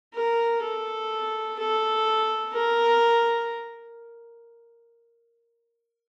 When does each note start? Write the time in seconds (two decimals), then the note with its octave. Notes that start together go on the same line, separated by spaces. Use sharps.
0.14 A#4
0.63 A4
1.59 A4
2.54 A#4